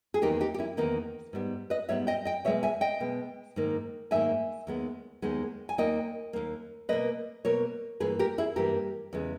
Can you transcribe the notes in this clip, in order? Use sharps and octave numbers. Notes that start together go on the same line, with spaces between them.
G#4
E2 D#3 A#3 D#4 G4
D#4 G4
G4
C#4 E4
E2 D#3 A#3 B3 D#4
G#2 G3 B3
B4 D#5
G#2 G3 B3 C#5 E5
D#5 G5
D#5 G5
B2 G#3 B3 C#5 E5
E5 G#5
D#5 G5
B2 G#3 B3
G#2 D#3 A#3
G#2 D#3 A#3 E5 G#5
D#2 D#3 G#3 B3
D#2 D#3 G#3 B3
G#5
D#2 D#3 A#3 D#5 G5
D#2 D#3 A#3
B2 A#3 B4 D#5
B2 A#3 A#4 C#5
G2 E3 A#3 G#4 B4
G4 A#4
E4 G#4
G2 E3 A#3 G4 A#4
E2 C#3 G#3